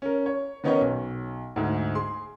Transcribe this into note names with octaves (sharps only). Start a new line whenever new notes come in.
C#4 A#4
C#5
D#3 B3 C#4 D#4 A#4 C#5
B1
D2 G#2
G#4 C6